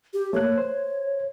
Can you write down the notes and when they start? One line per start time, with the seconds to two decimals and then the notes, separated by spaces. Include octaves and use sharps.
0.14 G4
0.33 A3 A#3 C#5 F#6
0.58 C5